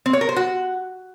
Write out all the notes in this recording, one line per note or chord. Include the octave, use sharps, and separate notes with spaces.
C4
C#5
A#4
C5
F#4